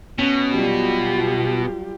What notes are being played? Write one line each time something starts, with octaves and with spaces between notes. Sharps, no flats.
B2 C#4
F#3 G3 F4 G4